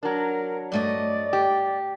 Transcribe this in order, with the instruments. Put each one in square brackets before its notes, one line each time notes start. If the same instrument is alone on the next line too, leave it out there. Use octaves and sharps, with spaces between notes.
[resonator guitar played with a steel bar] F#3 D4 [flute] A#4
[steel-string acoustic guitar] G2 A3 D#5 [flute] D5
[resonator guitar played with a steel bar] G4